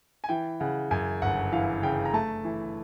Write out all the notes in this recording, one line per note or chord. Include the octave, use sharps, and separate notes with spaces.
G#5
E3 G5
C#3 F#5
F#2 G#5
G1 F#5
E3 F5
C#3 G5
A#5
A3 A5
E3